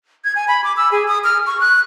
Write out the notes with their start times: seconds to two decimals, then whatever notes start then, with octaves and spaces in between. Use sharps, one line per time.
0.24 G#6
0.36 G#5
0.48 B5
0.64 D6
0.77 E6
0.92 G#4
1.08 D#6
1.24 F6
1.47 C#6
1.60 F#6